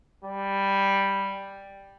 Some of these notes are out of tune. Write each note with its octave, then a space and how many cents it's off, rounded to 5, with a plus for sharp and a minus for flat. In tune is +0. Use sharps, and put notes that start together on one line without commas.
G3 +5